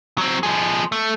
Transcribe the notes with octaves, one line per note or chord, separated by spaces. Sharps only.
F#3 C4
F3 G#4
A3